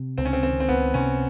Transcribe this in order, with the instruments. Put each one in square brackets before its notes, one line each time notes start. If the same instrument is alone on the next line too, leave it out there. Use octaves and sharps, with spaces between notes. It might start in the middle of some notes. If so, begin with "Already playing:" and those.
Already playing: [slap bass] C3
[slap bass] C#2 [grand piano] C4
[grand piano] C#4
C4
[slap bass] D#3 [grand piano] C4
[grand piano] C4
[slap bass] C#2 [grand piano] B3
[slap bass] C3 [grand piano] C#4